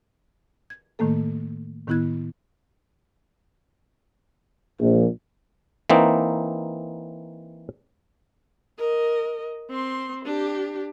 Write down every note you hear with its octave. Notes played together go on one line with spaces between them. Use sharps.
G#6
A2 D#3 A3 A#3 A4
A2 D#3 B3 E4 F#6 G#6
A#1
E3 A#3 C4 D#4
A#4 D#5
C4 C6
D4 G4